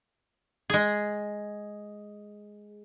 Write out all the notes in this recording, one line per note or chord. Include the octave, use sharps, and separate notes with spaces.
G#3 G#4